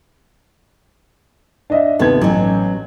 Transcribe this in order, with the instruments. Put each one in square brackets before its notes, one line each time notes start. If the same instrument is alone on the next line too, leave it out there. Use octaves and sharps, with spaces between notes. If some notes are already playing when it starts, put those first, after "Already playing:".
[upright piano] D4 D#5 E5
[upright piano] D#2 C3 G#6 [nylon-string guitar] B3 A4
[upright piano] A1 [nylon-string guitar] F#3 C#4